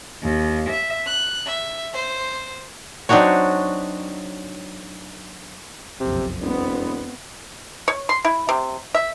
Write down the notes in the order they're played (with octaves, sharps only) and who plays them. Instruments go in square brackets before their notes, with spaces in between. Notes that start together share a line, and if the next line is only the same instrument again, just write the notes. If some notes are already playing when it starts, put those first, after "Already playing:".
[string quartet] D#2
E5
F#6
E5
C5
[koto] F#3 C4 D4 D#4 F#4 C#5
[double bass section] F#1 B1 F2 [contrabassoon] C3
[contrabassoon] E1 [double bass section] B3 C4
[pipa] C#5
C6
E4
C3
E5